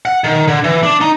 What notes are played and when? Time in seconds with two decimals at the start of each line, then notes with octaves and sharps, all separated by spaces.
0.05 F#5
0.24 D#3
0.48 D3
0.64 E3
0.83 D4
1.01 D#4